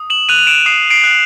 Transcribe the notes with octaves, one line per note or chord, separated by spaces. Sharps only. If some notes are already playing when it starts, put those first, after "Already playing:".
Already playing: D#6
E7 F#7
F#6 D#7 F7
F7
D7 E7
D#6 C7
C7 D7
F#6